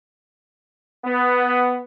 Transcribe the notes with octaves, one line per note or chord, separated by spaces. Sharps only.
B3